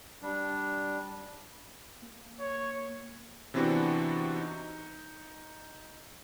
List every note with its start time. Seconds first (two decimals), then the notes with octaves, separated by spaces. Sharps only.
0.22 G3 D4
2.02 A#3
2.39 C#5
3.54 C3 E3 B3 C4 D4 F#4
4.36 D#4